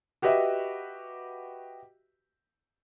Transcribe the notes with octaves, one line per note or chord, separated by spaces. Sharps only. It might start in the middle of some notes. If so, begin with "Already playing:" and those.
F#4 G4 B4 D#5 E5